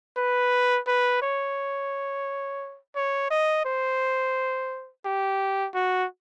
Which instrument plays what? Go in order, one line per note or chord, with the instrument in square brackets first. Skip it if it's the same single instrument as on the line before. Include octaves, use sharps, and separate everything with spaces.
[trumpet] B4
B4
C#5
C#5
D#5
C5
G4
F#4